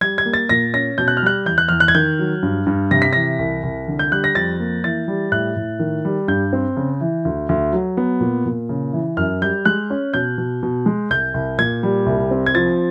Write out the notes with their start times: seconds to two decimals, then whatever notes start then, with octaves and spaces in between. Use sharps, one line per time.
0.01 G3 G#6
0.18 G#6
0.25 A#3
0.34 A6
0.49 A#2 A#6
0.74 C#4 A#6
0.98 B2 G6
1.08 F#6
1.17 F6
1.22 G3 F#6
1.46 E2 G6
1.58 F#6
1.69 E2 F6
1.80 F#6
1.88 G#6
1.95 D#3 G6
2.19 F#3
2.43 G2
2.67 G2
2.91 C3 A#6
3.02 B6
3.13 E3 A#6
3.39 C2
3.63 C2
3.88 D3
3.99 G6
4.11 G3 F#6
4.24 A#6
4.35 F2 A6
4.60 A#3
4.84 E3 A6
5.08 G3
5.32 A2 F#6
5.56 A2
5.79 D#3
6.05 G3
6.28 G2 G6
6.53 C4
6.77 C#3
7.01 E3
7.25 D2
7.49 D2
7.73 F#3
7.97 B3
8.21 A#2
8.46 A#2
8.69 C#3
8.93 E3
9.17 F#2 F6
9.41 G3 G6
9.65 G#3 F#6
9.90 C#4
10.14 B2 G6
10.38 B2
10.63 B2
10.86 G#3
11.10 C2 G6
11.34 C2
11.58 A#2 G#6
11.83 G3
12.06 C2
12.31 C4
12.46 G#6
12.55 F3 A6